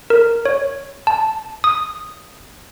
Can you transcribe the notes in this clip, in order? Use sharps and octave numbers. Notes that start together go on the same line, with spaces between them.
A#4
C#5
A5
D#6